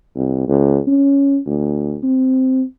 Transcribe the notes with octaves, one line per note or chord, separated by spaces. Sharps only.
C2
C#2
C#4
D2
C4